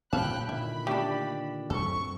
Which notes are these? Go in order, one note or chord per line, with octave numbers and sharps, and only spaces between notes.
A#2 C#5 F5 G5 A5 B5 F#6
A#2 D3 D#3 E4 B5
A3 D4 G4
F#2 F#3 C4 A4 C#6